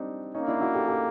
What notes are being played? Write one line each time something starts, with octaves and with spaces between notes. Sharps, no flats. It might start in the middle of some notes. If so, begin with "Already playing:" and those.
Already playing: G3 C4 D4 D#4
A#3 C#4 D#4
D4 E4
E4 F#4
G4 A4
G4 A4